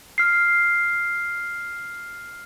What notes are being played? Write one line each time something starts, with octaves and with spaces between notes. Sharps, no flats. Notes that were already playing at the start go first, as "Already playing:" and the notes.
F6 C7